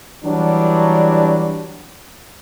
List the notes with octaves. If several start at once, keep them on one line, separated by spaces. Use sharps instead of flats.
E3 F#3 G3 D4